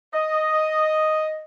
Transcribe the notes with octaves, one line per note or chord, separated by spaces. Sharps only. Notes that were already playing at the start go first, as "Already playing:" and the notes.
D#5